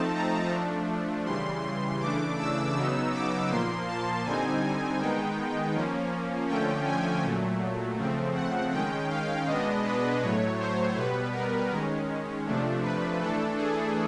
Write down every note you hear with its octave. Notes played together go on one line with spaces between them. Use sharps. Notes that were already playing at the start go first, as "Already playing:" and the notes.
Already playing: F3 A3 C4 D#4 A5
A#5
F3 A3 D4
C#3 E3 G3 C6
C#3 E3 A3 D4 D6
E6
C#3 F#3 B3 D#4 E6
D6
A#2 F3 A#3 C6
A5
D3 G3 C4 D#4 G#5
D#3 G#3 B3 D#4 G5
F3 A#3 C#4
D3 F3 A3 C#4 G5
G#5
A#2 F#3 A3
C#3 F3 A3 C4
F#5
D#3 G#3 C#4 G5
F5
B2 G#3 B3 D4 D#5
B4
A2 F#3 A3 C#5
C5
B2 G3 B3 B4
A#4
D#3 G#3 C#4
C3 F3 A3 D4
B4
E3 A3 D4 A4
G#4